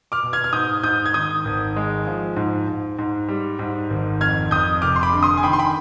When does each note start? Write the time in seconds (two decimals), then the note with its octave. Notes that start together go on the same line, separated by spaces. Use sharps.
0.12 D6 F6
0.23 B2
0.33 F6 G#6
0.44 F6
0.53 G#2 D#6 G6
0.83 G#2 D#6 G6
1.06 G#6
1.14 D#3 D#6 G6
1.45 G#1
1.76 G#3
2.07 F3
2.37 G#2
2.68 G#2
2.99 G#2
3.28 G3
3.59 G#2
3.90 G#1
4.21 F2 F6 G#6
4.51 F2 D#6 G6
4.82 F1 D6 F6
4.96 C6
5.03 B5 D6
5.13 D3
5.23 C6 D#6
5.37 G#5
5.43 D#3 G5 B5
5.53 C6
5.59 G5 B5